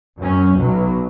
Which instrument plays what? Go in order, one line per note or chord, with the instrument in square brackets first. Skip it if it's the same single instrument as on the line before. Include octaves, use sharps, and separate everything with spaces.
[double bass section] F#2 F#3 C#4
B1 B2 F#3